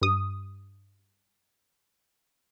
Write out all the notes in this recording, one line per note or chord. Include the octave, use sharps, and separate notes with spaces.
G2 D#6